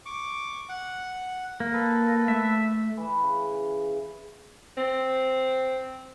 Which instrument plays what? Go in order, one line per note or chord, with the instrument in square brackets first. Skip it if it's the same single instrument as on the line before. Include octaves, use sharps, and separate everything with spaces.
[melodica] C#6 D6
F#5
[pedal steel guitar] A#3
[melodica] A4 B4
[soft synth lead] A3 [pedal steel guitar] E5
[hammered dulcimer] E3
C#3
[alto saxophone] C4